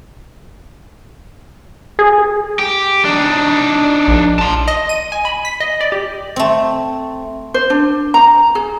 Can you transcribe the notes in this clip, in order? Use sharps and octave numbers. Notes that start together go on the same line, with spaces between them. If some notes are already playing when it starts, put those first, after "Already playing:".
G#4
G4
D4 D#4
A#1
A5 C6
D#5
D#7
G#5
B5
B6
D#5
D5
G4
A3 C4
C5
D4
A#5
G#4